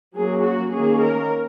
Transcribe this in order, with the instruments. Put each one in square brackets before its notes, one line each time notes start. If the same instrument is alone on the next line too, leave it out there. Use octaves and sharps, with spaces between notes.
[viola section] F#3 A#3 C#4 G#4
F#4
D#3 A#3 C#4 G#4
A#4